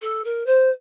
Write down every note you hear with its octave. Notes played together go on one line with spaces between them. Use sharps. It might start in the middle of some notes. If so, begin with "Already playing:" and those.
A4
A#4
C5